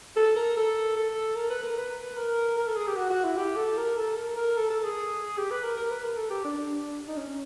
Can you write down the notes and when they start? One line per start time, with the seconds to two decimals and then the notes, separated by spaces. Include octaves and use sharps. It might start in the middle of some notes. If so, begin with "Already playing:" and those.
0.16 A4
0.36 A#4
0.57 A4
0.96 A4
1.36 A#4
1.50 B4
1.63 A#4
1.77 B4
2.17 A#4
2.57 A#4
2.67 A4
2.76 G#4
2.87 G4
2.97 F#4
3.10 F#4
3.24 E4
3.37 G4
3.56 A4
3.77 A#4
3.97 A4
4.17 A#4
4.36 A#4
4.57 A4
4.70 A4
4.84 G#4
5.37 G4
5.51 B4
5.64 A#4
5.77 A#4
5.91 B4
6.04 A#4
6.17 A4
6.30 G4
6.45 D4
6.58 D4
7.08 D#4
7.17 C#4
7.28 C#4